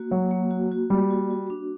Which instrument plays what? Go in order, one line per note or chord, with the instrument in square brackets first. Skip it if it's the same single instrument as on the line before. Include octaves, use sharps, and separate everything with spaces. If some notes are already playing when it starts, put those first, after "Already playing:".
Already playing: [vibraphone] A#3 F#4
[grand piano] F#3 [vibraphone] A#3
[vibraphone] A#3
F#4
F#4
[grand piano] G3 [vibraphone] D5
[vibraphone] F#4
F#4
D4